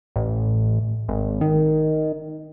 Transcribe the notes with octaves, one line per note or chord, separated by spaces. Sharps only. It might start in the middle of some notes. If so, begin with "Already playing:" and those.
A1
G#1
D#3